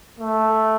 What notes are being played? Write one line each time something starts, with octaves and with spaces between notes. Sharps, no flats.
A3